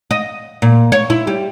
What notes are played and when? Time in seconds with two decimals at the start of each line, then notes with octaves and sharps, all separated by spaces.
0.11 D#5
0.62 A#2
0.92 C#5
1.10 E4
1.27 G3